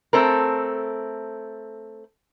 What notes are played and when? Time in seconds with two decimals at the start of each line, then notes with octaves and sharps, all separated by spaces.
0.13 A3 C4 A4 A#4